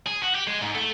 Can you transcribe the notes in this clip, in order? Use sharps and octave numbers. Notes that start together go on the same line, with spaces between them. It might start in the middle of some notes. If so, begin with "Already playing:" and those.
G#4
F#4
G4
G#3
G#2
A3